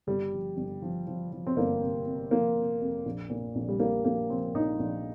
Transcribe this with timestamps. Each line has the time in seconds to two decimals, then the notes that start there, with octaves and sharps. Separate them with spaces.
0.07 G1 G3
0.33 F3
0.57 G1
0.82 F3
1.07 F3
1.32 F3
1.47 C4
1.56 G1 A#3
1.81 C3
2.06 C3
2.31 F3 A#3
2.56 C3
2.81 F2
3.06 A#1
3.30 A#2
3.55 A#1
3.69 G3
3.80 A#1 A#3
4.05 A#1 A#3
4.29 F3 C4
4.54 A#1 D#4
4.79 A#1